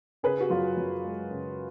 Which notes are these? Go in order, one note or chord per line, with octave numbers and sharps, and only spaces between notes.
C#3 G#4 B4
F#4
F#2 F4
F#2
G#3
C#3